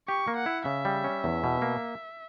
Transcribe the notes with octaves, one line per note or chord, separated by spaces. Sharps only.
G4 C#6
A#3
F#5
E4
C#3 E5
G3
C#4
E2
B2
A#3